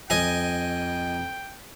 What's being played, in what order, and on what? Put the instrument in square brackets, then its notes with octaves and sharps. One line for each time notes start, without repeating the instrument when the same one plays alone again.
[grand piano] F2 [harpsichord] D#5 G#5 [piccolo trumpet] G5